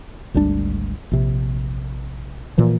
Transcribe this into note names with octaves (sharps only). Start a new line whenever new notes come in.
G#1 D2 G3 D4
A#1 C3
A#2 E3 F3